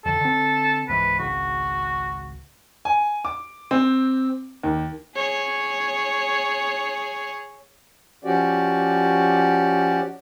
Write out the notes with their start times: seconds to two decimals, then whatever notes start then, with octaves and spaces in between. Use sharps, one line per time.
0.05 F2 D3 A4
0.21 D3 C4
0.89 C#2 G#2 E3 B4
1.19 G#1 C#2 F#4
2.85 G#5
3.25 D6
3.71 C4
4.63 D#2
5.16 G#4 C#5
8.24 F3 C#4 F#4 G4 D5